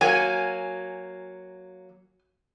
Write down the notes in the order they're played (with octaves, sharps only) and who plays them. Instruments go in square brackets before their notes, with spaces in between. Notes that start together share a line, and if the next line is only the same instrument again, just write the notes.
[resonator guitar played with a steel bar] F#3 A#3 [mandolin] G#5